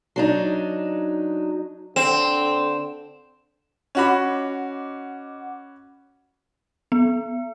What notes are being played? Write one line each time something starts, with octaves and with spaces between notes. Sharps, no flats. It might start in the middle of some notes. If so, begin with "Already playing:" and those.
F#3 D4 D#4
D3 C4 E7
C#4 F#4 D#5 F#5 B5 D6
B3